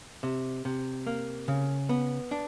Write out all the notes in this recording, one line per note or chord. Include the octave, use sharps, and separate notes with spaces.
C3
C3
A#3
C#3
B3
D4